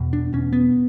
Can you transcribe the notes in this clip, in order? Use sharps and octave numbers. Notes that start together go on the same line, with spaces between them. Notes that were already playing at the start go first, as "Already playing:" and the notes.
Already playing: E2 B2
D4
E2 B2 C#4
B3